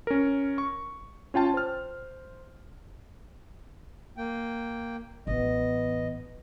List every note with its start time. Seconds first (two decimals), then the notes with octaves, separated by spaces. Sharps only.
0.07 C#4 A#4
0.58 C#6
1.34 C#4 F4 G5 A5
1.54 C5 F6
4.17 A#3 G5
5.27 A1 B3 D#5